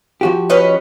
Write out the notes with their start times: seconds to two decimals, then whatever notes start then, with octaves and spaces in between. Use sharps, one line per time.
0.21 F3 F#4 G4
0.50 C#4 B4 D#5